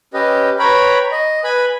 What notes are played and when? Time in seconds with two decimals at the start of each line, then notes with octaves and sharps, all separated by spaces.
0.14 C#4 G4 B4 D#5
0.59 B4 C#5 G5 A#5 B5
1.12 D#5
1.44 B4 G#5 B5